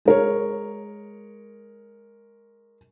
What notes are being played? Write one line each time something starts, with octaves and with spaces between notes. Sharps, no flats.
G#3 A#4 C#5